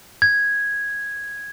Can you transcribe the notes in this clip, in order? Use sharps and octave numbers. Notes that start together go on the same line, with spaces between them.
G#6